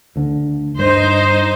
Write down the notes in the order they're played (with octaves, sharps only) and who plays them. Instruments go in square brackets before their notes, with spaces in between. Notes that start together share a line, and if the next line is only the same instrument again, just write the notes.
[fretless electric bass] D2 D3
[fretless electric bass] G2 [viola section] D#4 C5